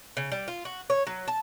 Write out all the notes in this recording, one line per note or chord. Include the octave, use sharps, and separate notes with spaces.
C#3
G3
F4
F#4
C#5
F#3
A5